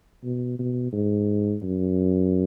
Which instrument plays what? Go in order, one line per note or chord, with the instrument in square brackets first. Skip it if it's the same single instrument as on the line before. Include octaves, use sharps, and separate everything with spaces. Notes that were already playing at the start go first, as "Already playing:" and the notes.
[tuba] B2
B2
G#2
F#2